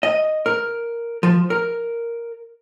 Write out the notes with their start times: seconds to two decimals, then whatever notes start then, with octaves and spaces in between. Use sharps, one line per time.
0.03 D#5
0.46 A#4
1.23 F3
1.50 A#4